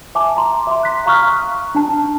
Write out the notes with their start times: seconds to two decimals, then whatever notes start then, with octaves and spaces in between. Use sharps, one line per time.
0.15 E5 G#5 A5 D6
0.37 A#5 C6
0.67 E5 C6
0.83 F#6 B6
1.06 F5 A#5 C#6 D#6 F6 F#6
1.75 D4 A5